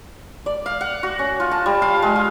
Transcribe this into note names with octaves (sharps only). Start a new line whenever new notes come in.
D5
F5
F#5
F#4
C#4
F4
A5
G3
F5
G#3
F4